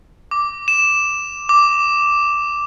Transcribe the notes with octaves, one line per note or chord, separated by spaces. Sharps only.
D6
E7
D6